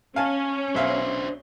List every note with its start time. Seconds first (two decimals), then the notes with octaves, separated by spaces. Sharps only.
0.16 C#4 F5 G#5 A5
0.75 B1 D4 C5 E5 F5